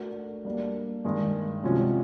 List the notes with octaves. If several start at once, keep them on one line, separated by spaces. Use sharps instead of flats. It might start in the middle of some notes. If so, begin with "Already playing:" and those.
Already playing: A3 D4 F#4 A#4 D5
G3 A#3 D4
G2 D#3 G#3
C3 F3 G#3 C#4 F#4